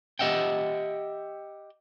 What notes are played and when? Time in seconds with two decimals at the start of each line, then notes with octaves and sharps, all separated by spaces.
0.19 G4 D#5 E5 F#5 G5